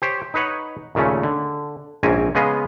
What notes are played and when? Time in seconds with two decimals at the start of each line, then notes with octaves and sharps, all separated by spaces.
0.02 G4 C5 C#5
0.34 D#4 B4 C#5 F#5
0.95 D#2 A#2 C#3 A3 C#4
1.23 D3
2.03 A#1 G#2 C4 C#4 G#5 A#5
2.35 C#3 G#3 B3 G#4 D#5 F5